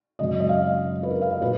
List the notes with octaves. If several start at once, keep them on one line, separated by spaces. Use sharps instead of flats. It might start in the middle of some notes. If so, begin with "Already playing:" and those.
F#2 C#3 G#3 D#5
D#5
F5
B4
A#4
F5
D#5
A#2 B4